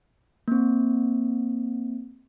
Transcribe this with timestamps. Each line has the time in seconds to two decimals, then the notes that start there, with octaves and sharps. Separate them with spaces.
0.48 A#3 C4